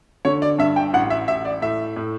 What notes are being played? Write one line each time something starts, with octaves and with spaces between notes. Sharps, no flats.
D3 C#5
D5
G2 E5
G5
A1 F#5
E5
A1 E5
D5
A2 E5
A2